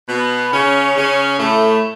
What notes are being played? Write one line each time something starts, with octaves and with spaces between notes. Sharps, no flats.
B2 B3
C#3 C#4
C#3 C#4
A2 A3